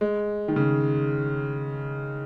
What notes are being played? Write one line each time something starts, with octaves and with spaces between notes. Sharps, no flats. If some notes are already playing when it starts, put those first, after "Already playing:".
G#3
D#3
C#3